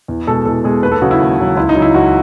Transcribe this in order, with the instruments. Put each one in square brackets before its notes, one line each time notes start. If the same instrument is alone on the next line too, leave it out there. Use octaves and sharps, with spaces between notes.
[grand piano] E2
B2 G#3 A4
E2 A4
B2 G#3 G#4
D#2 B4
A4
C#3 F#3 F#4
E4
D#2
C#3 F#3
C#2 E4
D#4
C#3 F#3
E4
C#2 F#4